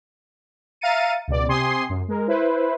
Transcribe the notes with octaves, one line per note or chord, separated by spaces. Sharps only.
E5 F5 A#5 A6 C#7 D#7
C#2 B2 D5
C3 G4 G#5 C6 D#6 C7
F#2
G#3 A#4
E4 B4 C5